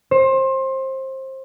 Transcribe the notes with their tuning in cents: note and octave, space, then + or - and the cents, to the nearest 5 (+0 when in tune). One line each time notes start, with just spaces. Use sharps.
C5 +25